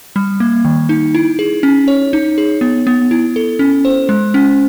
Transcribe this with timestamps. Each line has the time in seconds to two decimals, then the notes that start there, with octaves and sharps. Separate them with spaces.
0.16 G3
0.40 A#3
0.65 D#3
0.89 D#4
1.15 E4
1.39 G#4
1.63 C#4
1.88 C#5
2.13 D#4
2.38 G#4
2.61 B3
2.87 B3
3.11 E4
3.36 A4
3.59 C#4
3.85 C5
4.09 G#3
4.34 C#4